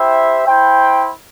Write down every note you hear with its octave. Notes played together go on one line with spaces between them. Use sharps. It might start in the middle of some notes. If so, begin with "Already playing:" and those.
Already playing: E4 G4 C5 E5 G5
E4 C5 G5